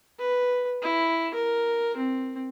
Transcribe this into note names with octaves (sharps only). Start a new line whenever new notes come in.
B4
E4
A#4
C4